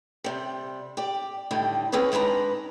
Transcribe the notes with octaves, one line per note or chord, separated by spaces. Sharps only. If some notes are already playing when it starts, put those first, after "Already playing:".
C3 G3
G4 D5
A2 D3 D#3 G3
C4 C#4 G#4 B4 C#5
D#3 G#3 D4 B4 A#5